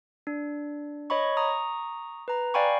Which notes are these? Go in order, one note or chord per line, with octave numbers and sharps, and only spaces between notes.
D4
C#5 D#5 B5 C#6
A#5 C#6 D#6
B4 A#5
D5 F5 G5 G#5 B5 C#6